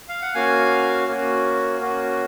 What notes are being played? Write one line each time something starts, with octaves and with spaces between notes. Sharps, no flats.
F5
F#5
A#3 C#4 F#4 F5 G#5
A#3 C#4 F#4
A#3 C#4 F#4